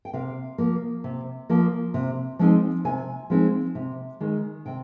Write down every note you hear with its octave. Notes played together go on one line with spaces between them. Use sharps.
G5
C3 F5
F3 A#3
C3
F3 A#3
C3
F3 G#3 C4 D#4
C3 G#5
F3 G#3 C4 D#4
C3
D#3 G#3
C3 G5